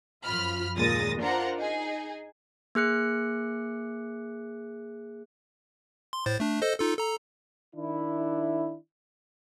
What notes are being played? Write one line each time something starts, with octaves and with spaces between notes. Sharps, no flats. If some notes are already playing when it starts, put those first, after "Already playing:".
F#2 F3 F4 B5 F6
D#2 A#2 G#3 D#6 A6 A#6
D4 F4 A#4 C5 F#5 A#5
D#4 G#4
A#3 G#4 F#6 C#7
C6
A2 C5 A6
A3 D4
A4 C5 D#5
D#4 F4 A4
A4 A#5
D#3 D4 E4